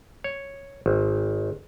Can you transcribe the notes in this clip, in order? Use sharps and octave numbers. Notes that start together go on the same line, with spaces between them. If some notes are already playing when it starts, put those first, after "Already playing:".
C#5
G#1